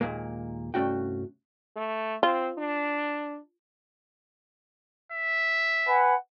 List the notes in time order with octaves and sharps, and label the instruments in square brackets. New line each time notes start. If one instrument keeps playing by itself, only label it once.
[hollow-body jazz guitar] D#2 A#2 G#3 A#3
C2 G2 A3 C#4 F#4 G5
[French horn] A3
[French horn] C4 [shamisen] F4
[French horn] D4
[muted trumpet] E5
[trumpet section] B4 F#5 G#5